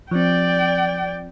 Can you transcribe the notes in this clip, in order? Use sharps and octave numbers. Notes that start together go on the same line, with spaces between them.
F3 C4 D5 G5